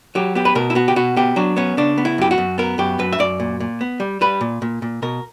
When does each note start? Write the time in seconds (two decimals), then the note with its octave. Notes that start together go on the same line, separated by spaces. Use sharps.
0.15 F#3 G4
0.35 B3 G4
0.45 B4
0.55 B2 A#4
0.70 E4
0.75 B3 F#4
0.88 G4
0.96 B2 F#4
1.16 B3 G4
1.36 F#3 D4
1.56 B3 C#4
1.77 C#3 D4
1.98 B3
2.05 E4
2.18 F#2 G4
2.31 F#4
2.38 F#2
2.58 B3 A#4
2.78 F#2 G4
2.99 F#2 B4
3.13 E5
3.19 F#2 D5
3.40 A#2
3.60 A#2
3.81 B3
4.00 G3
4.21 G3 B4
4.41 A#2
4.62 A#2
4.82 A#2
5.02 B2 A#4